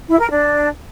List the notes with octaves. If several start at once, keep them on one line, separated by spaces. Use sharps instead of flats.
E4
A#4
D4